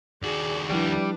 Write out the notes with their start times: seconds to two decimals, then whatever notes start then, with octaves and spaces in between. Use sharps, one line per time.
0.23 D#2 F#4 G#4 D5
0.70 F3 G3 D4 E4 B4